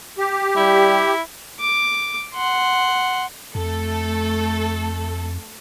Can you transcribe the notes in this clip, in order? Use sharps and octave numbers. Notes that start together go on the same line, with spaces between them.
G4
G3 E4
D6
F#5 C6
F2 A3 A4